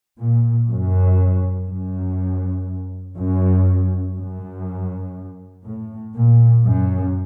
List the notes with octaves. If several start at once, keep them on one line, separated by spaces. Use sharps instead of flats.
A#2
F#2
F#2
F#2
F#2
A2
A#2
F#2